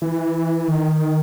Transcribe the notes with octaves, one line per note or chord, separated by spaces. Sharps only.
E3
D#3